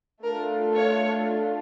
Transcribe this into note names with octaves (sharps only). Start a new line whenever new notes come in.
A3 D4 F4 A4 A#4
C#5